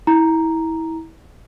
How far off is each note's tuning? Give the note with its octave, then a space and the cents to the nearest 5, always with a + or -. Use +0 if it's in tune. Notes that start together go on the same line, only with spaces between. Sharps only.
E4 -25 A#5 +0